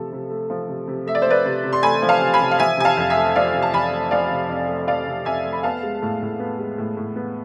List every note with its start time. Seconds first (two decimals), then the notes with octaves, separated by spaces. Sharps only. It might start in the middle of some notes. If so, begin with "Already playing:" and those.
Already playing: C3 F3 A3 A4
0.12 C3
0.30 A3
0.50 F3
0.69 C3
0.88 C3
1.06 A3 E5
1.15 D5
1.22 C5
1.26 F3 B4 D5
1.45 C3
1.64 C3
1.73 C6
1.83 A3 G#5 B5
2.02 F3
2.09 F5 A5
2.21 C3
2.34 G#5 B5
2.40 C3
2.51 F5
2.59 F3 E5 G#5
2.78 C3 G#5
2.85 F5 A5
2.97 F2
3.10 E5 G#5
3.17 A3
3.35 F3 D5 F5
3.54 C3
3.62 A5
3.74 F2 G#5 B5
3.93 A3
4.11 F3 D5 F5
4.31 C3
4.49 F2
4.68 A3
4.88 F3 D5 F5
5.07 C3
5.25 F2 E5 G#5
5.45 A3
5.53 B5
5.63 B3 F5 A5
5.83 G#3
6.02 A2
6.22 A2
6.39 B3
6.59 G#3
6.78 A2
6.97 A2
7.16 B3